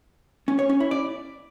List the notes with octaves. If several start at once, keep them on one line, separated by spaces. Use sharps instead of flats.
C#4
C#5
C#4
E4
D5